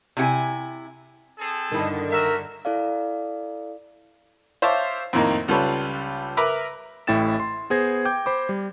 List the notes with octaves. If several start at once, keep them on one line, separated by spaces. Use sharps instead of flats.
C3 E4 F#4 G#5
C4 G#4 A4
G2 D3 D#3 E4
F#4 A#4 E5
E4 A4 D5 F5
C5 C#5 E5 F5 A5 D6
F2 A2 D#3 A#3 D#4
C#2 G3 F4 A4 B4 C#5
A#4 B4 E5 A#5 B5 D6
A1 A2 E4 G5 A6 E7
C6
B3 G#4 C5 G#6 A#6
G5 D6 G6
C5 B5 D6
G3